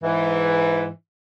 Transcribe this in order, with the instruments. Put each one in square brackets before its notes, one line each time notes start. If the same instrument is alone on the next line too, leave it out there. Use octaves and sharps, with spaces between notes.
[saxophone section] G#2 E3